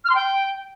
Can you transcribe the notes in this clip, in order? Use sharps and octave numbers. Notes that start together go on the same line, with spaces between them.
F6
C6
G5